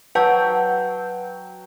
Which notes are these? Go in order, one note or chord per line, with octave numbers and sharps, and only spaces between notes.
F#3 B4 F#5 G5 A5